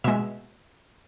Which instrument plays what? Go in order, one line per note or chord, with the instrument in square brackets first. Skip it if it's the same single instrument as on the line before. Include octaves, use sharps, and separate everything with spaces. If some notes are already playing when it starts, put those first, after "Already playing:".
[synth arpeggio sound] B2 G#3 E5